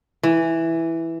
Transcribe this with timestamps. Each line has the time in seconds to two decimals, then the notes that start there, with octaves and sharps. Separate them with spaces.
0.23 E3